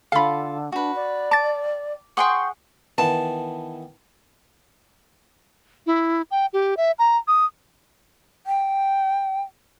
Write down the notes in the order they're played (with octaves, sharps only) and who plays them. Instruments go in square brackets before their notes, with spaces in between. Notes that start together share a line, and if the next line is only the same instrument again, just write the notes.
[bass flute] D3 [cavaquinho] F4 A4 [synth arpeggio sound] F5 B5
[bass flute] D4 [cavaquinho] F#4 B4
[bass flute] D5
[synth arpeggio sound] A5 A6 [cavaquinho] D6
[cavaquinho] G#4 F#5 D#6 [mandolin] G5 C6 C#6
[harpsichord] D#3 E3 B3 [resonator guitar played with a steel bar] A5
[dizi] E4
G5
G4
E5
A#5
D#6
[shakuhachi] G5